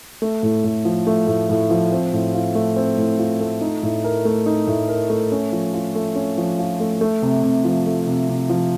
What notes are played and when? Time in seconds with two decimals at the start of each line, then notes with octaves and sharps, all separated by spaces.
0.22 A3
0.43 A2
0.64 A2
0.85 F3
1.07 A3
1.27 A2
1.50 A2
1.70 F3
1.92 C4
2.13 A2
2.34 F4
2.55 A3
2.76 C4
2.97 A2
3.19 F4
3.41 A3
3.61 D#4
3.83 A2
4.04 A#4
4.25 A3
4.46 D#4
4.67 A2
4.89 A#4
5.10 A3
5.32 C#4
5.52 F3
5.74 F4
5.95 A3
6.15 C#4
6.38 F3
6.59 F4
6.80 A3
7.01 A3
7.22 C3
7.43 C3
7.65 F3
7.87 A3
8.07 C3
8.29 C3
8.50 F3